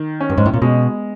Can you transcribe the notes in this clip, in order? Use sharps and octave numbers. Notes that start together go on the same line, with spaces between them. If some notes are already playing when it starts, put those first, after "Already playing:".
Already playing: D#3
C#4
G2
G#2
A2
A#2
B2 G#3